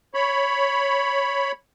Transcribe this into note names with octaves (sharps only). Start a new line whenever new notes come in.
C#5 B5